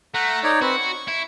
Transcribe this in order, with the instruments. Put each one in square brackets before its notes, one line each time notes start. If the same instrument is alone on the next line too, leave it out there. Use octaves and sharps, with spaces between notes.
[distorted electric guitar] A3 [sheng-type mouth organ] F#5 A#5
[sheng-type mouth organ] D#4 C#5 D5
[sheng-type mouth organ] C4 B4 [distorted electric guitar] F#4
[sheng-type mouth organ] C#6
[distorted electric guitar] E4